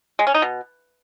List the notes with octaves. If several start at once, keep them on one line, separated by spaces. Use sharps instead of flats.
G#3
C#4
D#4
B2